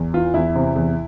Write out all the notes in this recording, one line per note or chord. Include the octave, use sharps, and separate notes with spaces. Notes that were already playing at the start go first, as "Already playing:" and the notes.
Already playing: E2
E3 F4
E2 E4
C3
E2